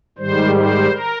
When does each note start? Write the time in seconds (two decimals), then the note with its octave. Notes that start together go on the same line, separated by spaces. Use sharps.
0.18 G#2 D#3 G3 C5
0.55 C5
0.90 A#4